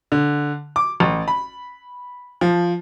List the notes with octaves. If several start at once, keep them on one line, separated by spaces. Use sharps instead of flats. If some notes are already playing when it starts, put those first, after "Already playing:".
D3
D6
A1
B5
F3